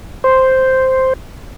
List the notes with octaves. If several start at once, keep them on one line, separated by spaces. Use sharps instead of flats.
C5